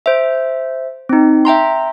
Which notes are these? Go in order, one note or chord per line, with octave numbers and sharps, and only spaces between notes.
C5 E5
C4 D#4
E5 G5 A#5 C6